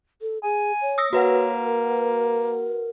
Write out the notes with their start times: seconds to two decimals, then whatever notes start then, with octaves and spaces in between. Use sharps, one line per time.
0.21 A4
0.44 G#4 G#5
0.81 C#5
0.98 D#6 E6 A#6
1.13 A#3 F#4 B4 C#5 F#5
1.64 A#4